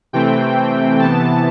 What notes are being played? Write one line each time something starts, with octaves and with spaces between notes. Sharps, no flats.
C3 E3 A3 C4 G5
C3 E3 B3 A5